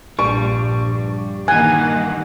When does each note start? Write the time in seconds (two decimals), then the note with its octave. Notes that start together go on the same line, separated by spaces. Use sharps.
0.19 A#1 G2 G3 D4 C#6
1.48 D#3 E3 A#3 F#5 G#5